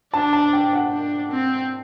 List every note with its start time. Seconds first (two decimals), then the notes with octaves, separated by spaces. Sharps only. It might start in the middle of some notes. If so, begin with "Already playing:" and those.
0.13 D4 A5
0.33 A5
0.53 G5
0.73 F#5
0.92 D4
1.32 C4